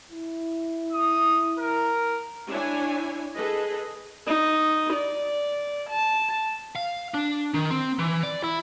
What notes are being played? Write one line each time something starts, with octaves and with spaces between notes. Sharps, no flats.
E4
D#6
A#4
D4 E4 C#5 G#5
G#4 A4 B4 D#5
D#4
D5
A5
F5
D4
D#3
C4
E3
D5
E4